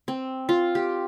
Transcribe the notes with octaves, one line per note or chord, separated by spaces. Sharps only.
C4
F4
G4